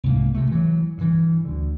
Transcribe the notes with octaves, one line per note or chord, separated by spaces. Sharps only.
C2 G#2 A#3
C3 A3
E3 F#3
G2 E3
D2 D3